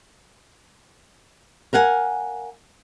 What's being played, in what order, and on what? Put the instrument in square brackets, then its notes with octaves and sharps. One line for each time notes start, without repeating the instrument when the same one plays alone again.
[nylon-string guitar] A#4 F5 F#5 G#5